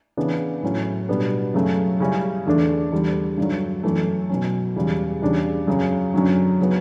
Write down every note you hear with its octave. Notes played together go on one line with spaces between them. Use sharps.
C#3 E3 B3 D4
A2 F#3 C#4 E4
B2 G3 B3 D4
F#2 C#3 F#3 A3
C#3 G3 C#4 E4
E2 D3 A3 D4
E2 D3 G3
G2 D3 F#3
F#2 E3 A3
B2 F#3 C#4
E2 C#3 G3
E2 C#3 G3 D4
F#2 C#3 F#3
F#2 D3 F#3 C#4
C#3 F#3 B3